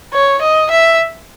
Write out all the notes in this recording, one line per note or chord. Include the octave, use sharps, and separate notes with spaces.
C#5
D#5
E5